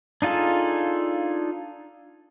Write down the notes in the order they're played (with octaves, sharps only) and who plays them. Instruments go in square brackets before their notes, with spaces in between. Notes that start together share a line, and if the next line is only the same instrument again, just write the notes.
[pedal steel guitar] D4 D#4 F4 G#4 A4